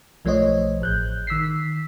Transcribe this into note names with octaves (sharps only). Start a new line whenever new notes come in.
B1 F3 A3 C5 C#5 D#5
A1 F#6 G6
D#3 E6 B6 C7